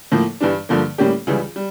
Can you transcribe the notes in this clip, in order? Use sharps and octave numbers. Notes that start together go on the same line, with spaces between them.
A2 F3 A#3
G2 E3 G3 D4
G2 D3 F3 A#3
A2 G3 A#3 C#4 G4
C#2 C#3 E3 G3
G3